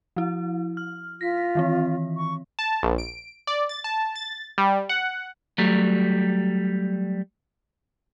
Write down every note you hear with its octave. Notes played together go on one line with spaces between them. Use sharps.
F3 E4
F6
F4 A#6 B6
D#3 E3 C4
C#6
A5
A#1
D7
D5
A6
A5
A6
G3
F#5
F#3 G3 A3